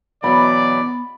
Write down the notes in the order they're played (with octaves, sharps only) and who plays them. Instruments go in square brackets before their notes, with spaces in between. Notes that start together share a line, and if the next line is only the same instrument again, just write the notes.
[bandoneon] B2 E3 F#3 [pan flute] B3 [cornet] D5 [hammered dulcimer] B5